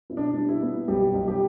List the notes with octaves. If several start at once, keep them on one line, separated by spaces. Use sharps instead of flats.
B2 E4
D4
G3 D4
E4
B3
B1 G3 G4
B1
G3 G4